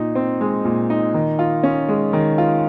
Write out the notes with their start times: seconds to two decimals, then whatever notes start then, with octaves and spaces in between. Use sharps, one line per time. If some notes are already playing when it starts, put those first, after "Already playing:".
Already playing: A#2 D#4
0.15 C4
0.41 G#3
0.65 A#2
0.90 D#4
1.14 D#3
1.39 F4
1.63 C#4
1.89 G#3
2.13 D#3
2.38 F4